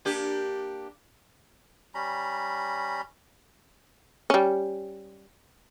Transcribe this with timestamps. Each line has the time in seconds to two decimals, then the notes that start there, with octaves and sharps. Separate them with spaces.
0.05 A#3 D4 G4
1.95 G3 C#4 A#5 B5
4.30 G3 C#4